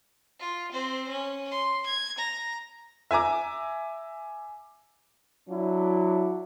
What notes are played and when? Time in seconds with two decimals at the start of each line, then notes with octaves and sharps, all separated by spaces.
0.40 F4
0.72 C4 C5
1.08 C#4
1.52 C6
1.86 G#6
2.18 A#5
3.11 E5 G#5 A#5 D6
5.49 F#3 D4 E4